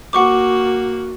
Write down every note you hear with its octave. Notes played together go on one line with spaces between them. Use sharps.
A#3 F#4 F#5 C#6 D6